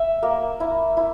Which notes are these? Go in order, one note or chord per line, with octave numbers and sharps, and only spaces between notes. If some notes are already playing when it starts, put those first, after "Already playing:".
Already playing: E5
A#3
E4
E4